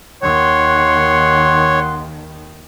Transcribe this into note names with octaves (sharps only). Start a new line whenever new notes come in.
D#2 D#3 C#5 F#5 C6